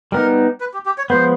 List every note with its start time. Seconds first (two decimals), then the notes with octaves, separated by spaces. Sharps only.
0.12 G3 B3 D#4 A#4
0.60 B4
0.74 G4
0.86 G4
0.98 C#5
1.10 F3 G#3 B3 C5